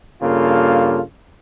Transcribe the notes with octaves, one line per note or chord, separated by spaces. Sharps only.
G2 C#3 A#3 F4 A4